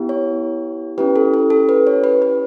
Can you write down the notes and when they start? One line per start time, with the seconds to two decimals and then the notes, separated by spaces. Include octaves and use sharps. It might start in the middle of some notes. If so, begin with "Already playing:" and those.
Already playing: B3 E4 G4
0.09 C#5
0.98 C#4 E4 G4 B4
1.16 A4
1.34 A4
1.50 A4
1.69 B4
1.87 C#5
2.04 B4
2.22 B4